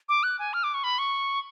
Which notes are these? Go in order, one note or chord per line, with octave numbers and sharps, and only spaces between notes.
D6
F#6
G#5
F6
D6
C#6
B5
C#6